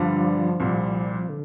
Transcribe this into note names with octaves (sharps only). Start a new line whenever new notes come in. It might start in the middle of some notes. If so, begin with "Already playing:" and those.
Already playing: G2 D3 F3 G3 D4 F4
C2 A#2 G3
D3